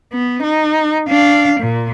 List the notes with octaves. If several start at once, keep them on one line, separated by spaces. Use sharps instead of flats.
B3
D#4
D4 F5
A#2